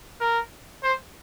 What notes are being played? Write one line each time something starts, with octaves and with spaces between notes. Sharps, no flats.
A#4
C5